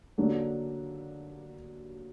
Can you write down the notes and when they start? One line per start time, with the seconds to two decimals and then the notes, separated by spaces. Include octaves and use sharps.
0.18 D3 F#3 A#3 D4 A4